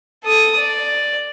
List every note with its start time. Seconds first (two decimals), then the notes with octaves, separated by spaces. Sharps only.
0.24 A4 D#6
0.57 D5